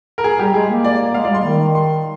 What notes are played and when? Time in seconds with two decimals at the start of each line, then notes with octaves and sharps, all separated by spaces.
0.18 A#4
0.24 G#4
0.39 G3 G4
0.54 G#3 G#4
0.70 A#3
0.84 D5
1.14 G#3 F5
1.25 D5
1.30 G3 C6
1.44 D#3
1.75 C6